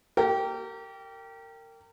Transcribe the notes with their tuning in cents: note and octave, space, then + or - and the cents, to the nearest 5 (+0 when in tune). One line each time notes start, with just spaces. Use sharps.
G4 -35 A#4 -30 G5 +0